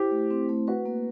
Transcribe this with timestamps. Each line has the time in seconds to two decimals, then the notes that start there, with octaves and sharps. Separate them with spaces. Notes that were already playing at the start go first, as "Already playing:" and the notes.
Already playing: E4 G4 C5
0.11 A3
0.31 C4
0.49 A3
0.68 F#4 B4
0.85 A#3